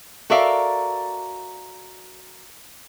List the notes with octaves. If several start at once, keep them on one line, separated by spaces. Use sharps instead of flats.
F#4 A4 A#4 D5 E5 F5